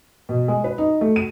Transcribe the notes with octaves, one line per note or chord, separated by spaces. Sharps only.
B2
G#3
B4
D#4
A3
D#7